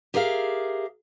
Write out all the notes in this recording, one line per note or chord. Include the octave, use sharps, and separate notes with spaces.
G4 G#4 A#4 E5 F5